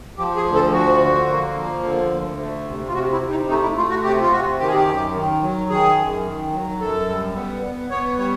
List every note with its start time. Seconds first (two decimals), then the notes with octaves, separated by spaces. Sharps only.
0.18 F3 G4
0.36 G#4
0.46 D2
0.54 A4
0.73 F3 F#4
1.01 D3
1.29 A#3
1.56 F3
1.83 D3
2.11 D2
2.39 A3
2.66 C3
2.88 F4
2.94 C3 F#4
3.12 E4
3.22 C3
3.30 D#4
3.49 A3 D#4
3.63 E4
3.77 A3 F4
3.90 F#4
4.04 C3 G4
4.21 F4
4.32 C3 F#4
4.59 D#3 G4
4.67 G#4
4.75 G4
4.87 F#2
5.15 D#3
5.42 F#3
5.70 D#3 G#4
5.98 F#2
6.25 D#3
6.52 F#3
6.80 F#2 A4
7.08 G3
7.35 B3
7.63 B3
7.90 B3 C#5
8.18 G3 C#5